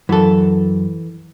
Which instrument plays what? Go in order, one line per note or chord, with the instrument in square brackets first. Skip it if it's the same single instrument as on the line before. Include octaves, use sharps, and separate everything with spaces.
[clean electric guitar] F#2 [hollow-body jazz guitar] E3 A4